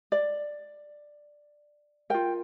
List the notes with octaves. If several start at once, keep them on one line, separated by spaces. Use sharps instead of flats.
D5
F4 A#4 G5